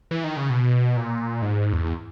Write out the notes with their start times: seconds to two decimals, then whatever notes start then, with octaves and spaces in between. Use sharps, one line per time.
0.11 E3
0.24 D#3
0.37 C#3
0.50 B2
0.97 A#2
1.42 G#2
1.73 E2